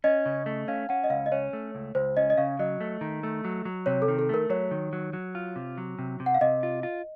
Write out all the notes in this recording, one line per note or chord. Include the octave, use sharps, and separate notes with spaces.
C#4 D#5
C#3
A3
C#4 F5
C#4 F#5
D#5
C#2 F5
D#5
C#4 C#5
A3
C#2
C#2 C5
C#4 D#5
D#5
C#3 F5
F#3 D#5
A3
D#3
A3
F#3
F#3
C3 C#5
A4
D#3
A4
A3 A#4
F#3 C#5
D#3
F#3
F#3
F4
C3
F#3
C3
C3
F#5
F5
C3 D#5
F4
F4